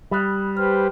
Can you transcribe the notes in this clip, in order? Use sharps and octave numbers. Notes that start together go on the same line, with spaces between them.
G3 B5 D#6 F#6
G4 B4 C5 F6